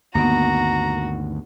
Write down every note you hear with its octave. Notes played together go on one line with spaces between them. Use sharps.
D2 G2 D#3 A#3 B3 F#4 A#5